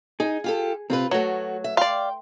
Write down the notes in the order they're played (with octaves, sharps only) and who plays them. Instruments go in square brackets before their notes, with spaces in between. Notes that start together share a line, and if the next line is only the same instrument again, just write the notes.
[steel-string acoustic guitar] D#4 [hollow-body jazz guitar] G#4
[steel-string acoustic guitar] F4 G4 A4
[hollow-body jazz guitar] C3 [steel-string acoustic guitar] C4 F4 B4
[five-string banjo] F#3 [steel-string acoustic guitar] A3 F#4 [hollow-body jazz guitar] C#5
[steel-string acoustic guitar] E5
[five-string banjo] D5 F5 [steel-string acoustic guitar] G5 [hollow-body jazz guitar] C6